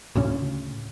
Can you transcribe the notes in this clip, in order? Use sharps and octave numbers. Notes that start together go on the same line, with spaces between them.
D2 A2 C#3 C#4